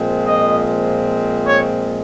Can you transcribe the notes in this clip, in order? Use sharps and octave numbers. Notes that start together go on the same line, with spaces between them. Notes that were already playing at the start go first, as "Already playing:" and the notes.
Already playing: A#2 F3 G#3 C4
D#5
C#5